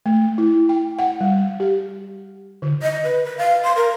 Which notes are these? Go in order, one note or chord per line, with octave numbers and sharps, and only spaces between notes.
A3
E4
G5
F#5
G3
G4
D3
D#5
B4
B4
F5
C6
A#4